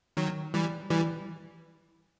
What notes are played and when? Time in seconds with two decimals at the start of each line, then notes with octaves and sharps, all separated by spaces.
0.17 D#3 F#3
0.54 E3 G3
0.90 E3 G3